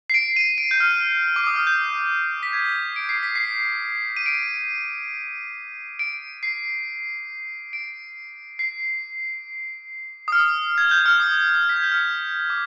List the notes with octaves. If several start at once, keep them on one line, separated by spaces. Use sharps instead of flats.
C7
D7
D#7
D7
G6
F6
D6
D#6
F6
G6
B6
G#6
D7
C7
B6
C7
D#7
D7
D7
C7
D7
C7
D#6
F6
G#6
G6
F6
D#6
B6
G#6
G6
F6
D6